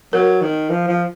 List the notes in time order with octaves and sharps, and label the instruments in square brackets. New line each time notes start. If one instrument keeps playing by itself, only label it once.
[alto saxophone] F#3 [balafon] A#4
[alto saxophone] D#3
F3
F3